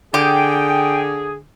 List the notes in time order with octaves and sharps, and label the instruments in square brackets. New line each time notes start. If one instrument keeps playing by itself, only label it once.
[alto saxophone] D3 [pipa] G4 [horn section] G#4 [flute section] G5